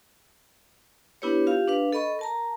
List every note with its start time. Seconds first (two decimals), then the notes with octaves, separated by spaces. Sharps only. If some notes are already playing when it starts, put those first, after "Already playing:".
1.22 B3 D4 E4 G4 B4 C#5
1.47 F4 G4 F5
1.68 D4 B4 F5
1.93 A4 D#5 B5 C#6
2.19 A#4 A5 A#5